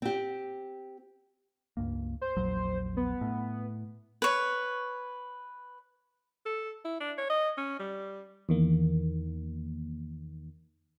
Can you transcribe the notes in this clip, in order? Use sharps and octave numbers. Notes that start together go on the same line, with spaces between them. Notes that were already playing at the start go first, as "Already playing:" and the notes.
C4 G4
C#2 G2 A#3
C5
A#1 E2 F#3
B3
A2
B4 C#5
A4
E4
D4
C#5
D#5
C#4
G3
E2 D#3 A#3